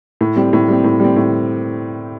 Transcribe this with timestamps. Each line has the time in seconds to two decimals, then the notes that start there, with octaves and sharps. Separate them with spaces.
0.21 A2
0.36 G3 C4
0.53 A2
0.68 G3 C4
0.84 A2
1.00 G3 C4
1.16 A2